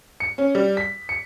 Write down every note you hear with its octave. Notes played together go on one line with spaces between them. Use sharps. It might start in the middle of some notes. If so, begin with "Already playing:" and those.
C#7
C#4
G3
B6
C#7